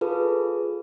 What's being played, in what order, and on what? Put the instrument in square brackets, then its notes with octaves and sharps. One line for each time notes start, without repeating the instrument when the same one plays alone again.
[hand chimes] F4 G#4 A4 B4